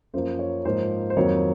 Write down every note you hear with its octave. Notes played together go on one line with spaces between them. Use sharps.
F#2 F3 A#3 C5
C#5
G#2 F3 A#3 C5
C5
F2 D#3 F#3 A#3 C#5